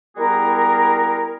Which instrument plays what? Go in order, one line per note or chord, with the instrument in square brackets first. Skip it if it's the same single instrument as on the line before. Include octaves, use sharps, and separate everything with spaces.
[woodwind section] G3 B3 E4 F#4 G#4 A#4